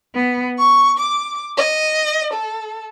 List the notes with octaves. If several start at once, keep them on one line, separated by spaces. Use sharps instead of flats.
B3
C#6
D6
D#5
A4